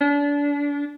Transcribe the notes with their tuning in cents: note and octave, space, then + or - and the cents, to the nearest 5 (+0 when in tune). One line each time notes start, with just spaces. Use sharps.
D4 -30